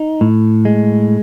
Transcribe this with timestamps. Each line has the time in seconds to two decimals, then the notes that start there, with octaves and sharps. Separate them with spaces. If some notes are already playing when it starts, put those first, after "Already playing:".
Already playing: D#4
0.21 A2
0.65 G#3